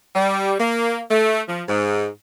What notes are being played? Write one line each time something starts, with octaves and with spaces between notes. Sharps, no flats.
G3
A#3
A3
F3
G#2